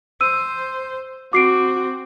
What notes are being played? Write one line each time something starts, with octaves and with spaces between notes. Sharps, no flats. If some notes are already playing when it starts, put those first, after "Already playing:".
C5 E6 D#7
C4 F#4 D6 C7 D7